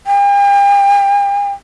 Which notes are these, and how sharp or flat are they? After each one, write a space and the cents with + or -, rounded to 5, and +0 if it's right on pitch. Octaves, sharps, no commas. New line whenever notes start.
G5 +45